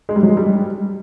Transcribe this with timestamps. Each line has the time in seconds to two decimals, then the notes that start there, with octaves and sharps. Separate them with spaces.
0.09 G#3
0.16 G3
0.23 F#3
0.30 G#3
0.37 G3